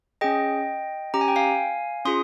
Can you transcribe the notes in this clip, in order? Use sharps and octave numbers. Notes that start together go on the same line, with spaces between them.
C#4 G#4 D#5 G5
C#4 G4 A#5
G#5
G5
F5 G#5
C#4 F4 G#4 C6 D#6